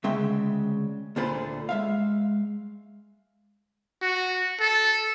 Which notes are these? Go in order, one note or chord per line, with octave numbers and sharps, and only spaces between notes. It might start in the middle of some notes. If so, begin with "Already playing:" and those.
D2 C#3 G#3 E5 G5 C6
D2 A#2 D3 F4 C5 B5
G#3 E5 F5
F#4
A4